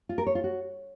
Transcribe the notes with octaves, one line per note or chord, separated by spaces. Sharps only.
F4
A#4
C#5
F4
F#4